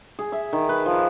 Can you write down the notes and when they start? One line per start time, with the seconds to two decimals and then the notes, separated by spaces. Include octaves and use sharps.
0.19 G#4
0.32 E5
0.53 D#3
0.69 B4
0.86 F3